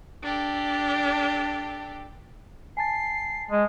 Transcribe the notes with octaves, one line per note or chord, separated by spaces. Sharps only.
D4 G4 A4
G#5 A5 A6 C7
G#3